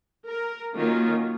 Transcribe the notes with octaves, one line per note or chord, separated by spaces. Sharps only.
A#4
D#3 F#3 A#3 C#4 F4